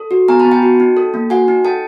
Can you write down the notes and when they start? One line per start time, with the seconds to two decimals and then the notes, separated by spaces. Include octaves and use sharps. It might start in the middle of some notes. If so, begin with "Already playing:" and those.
Already playing: A4
0.11 F#4
0.28 B3 G#5 A#5
0.40 A5 B5
0.45 B3
0.52 G5 A5
0.63 F#4
0.80 D#4
0.97 A4
1.14 A#3
1.30 F#4 F#5 G#5
1.48 D#4
1.65 A4 G5 A5